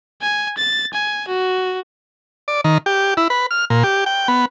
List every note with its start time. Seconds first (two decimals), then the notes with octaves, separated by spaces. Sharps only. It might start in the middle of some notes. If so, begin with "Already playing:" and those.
0.22 G#5
0.58 A6
0.94 G#5
1.28 F#4
2.48 D5
2.64 D#3
2.86 G4
3.17 E4
3.30 B4
3.51 F6
3.70 A#2
3.84 G4
4.06 G5
4.28 B3